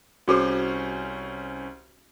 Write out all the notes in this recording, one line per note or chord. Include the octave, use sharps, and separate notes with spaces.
C2 C#4 F#4 G#4 A4 C5